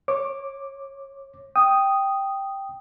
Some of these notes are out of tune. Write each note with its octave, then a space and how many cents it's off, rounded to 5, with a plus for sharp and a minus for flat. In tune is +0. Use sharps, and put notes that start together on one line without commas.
C#5 -20 D6 +0
G5 +0 D#6 +0